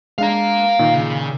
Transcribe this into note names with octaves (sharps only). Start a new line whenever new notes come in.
G#3 D4 F5 A#5
A#2 D#3
C#3